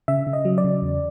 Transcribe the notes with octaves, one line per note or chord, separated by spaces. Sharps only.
C#3 E5
C#3
D#5
F#3
D5
C#3
E2